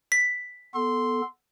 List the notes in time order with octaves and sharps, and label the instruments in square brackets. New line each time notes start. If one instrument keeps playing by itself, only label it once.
[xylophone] B6
[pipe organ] B3 A4 [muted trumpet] C6